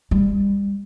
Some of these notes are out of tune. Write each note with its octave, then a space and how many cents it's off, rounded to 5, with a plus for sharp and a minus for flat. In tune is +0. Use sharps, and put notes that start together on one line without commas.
G3 +30